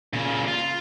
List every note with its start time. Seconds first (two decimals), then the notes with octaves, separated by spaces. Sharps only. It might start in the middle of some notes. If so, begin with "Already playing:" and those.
0.13 A#2 C#3
0.48 F4